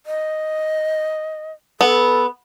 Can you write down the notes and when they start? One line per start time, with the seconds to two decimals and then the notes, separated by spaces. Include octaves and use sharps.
0.06 D#5
1.81 B3 A4